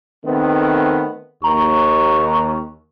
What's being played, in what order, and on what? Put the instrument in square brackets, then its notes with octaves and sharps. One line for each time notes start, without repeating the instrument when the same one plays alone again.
[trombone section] D#3 A3 B3 [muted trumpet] C4
[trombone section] D#2 [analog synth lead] A#5 [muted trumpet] C#6